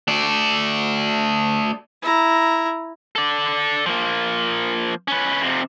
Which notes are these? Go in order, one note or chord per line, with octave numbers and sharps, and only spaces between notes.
A3 D5
E4 A#5
A4 D5
F3 A#3
C#4 B4
F2 C3